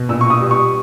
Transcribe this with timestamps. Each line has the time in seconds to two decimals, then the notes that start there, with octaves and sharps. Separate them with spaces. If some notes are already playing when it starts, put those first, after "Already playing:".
Already playing: B2
0.09 A#2 E6
0.21 C#6
0.30 D#6
0.40 G3
0.51 C#6